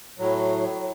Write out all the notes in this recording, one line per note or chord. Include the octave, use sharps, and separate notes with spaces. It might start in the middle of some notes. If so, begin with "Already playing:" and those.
A2 F#3